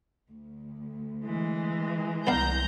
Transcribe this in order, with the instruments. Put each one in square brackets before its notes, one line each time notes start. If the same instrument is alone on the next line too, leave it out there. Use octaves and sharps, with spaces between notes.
[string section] D2
[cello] E3 G#3
[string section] C2 A#5 G6 [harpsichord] B3 D4 F5